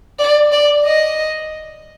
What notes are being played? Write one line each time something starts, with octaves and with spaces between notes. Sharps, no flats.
D5
D5
D#5